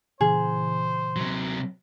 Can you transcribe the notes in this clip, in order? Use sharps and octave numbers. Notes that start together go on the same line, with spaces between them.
A#2 C#3 E3 G#4 C5
C3 F#3